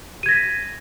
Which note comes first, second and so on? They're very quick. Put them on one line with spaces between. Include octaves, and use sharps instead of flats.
D#7 G#6 A#6 B6